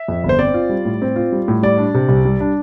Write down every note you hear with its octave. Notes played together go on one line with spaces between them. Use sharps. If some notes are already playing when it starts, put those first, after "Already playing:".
Already playing: E5
F2
G1
C5
C4 D5
F4
G3
A2
C4
F4
G3
A2
G3 D5
D4
C3
C2
G3
D4